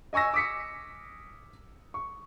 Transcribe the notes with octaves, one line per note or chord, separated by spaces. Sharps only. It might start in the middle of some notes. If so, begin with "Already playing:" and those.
D#5 G#5 C#6 E6 A#6
D6 D#6 B6 C#7
C#6